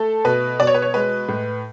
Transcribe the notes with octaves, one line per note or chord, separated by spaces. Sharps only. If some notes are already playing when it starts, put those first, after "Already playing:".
Already playing: A3 A4
B2 B4
B2 D5
C#5
B4
C#5
G#3 B4
A2